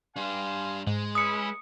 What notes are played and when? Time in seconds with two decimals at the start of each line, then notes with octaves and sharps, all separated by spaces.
0.16 G3 D4 F5 G#5 C6
0.87 G#2 G#3
1.15 C#4 E4 B4 D#6 C#7